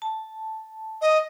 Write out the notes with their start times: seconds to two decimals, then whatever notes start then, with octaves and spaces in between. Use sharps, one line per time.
0.02 A5
1.01 D#5